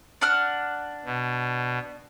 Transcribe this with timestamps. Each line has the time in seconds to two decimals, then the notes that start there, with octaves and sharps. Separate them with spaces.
0.21 D4 F#5 F6
1.05 B2